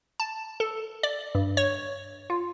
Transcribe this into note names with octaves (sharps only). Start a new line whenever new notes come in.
A5
A4
D5
G2
C#5
F4